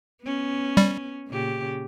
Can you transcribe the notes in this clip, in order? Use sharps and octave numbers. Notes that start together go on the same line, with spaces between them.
B3 C#4
G3
A#2 C#3 G4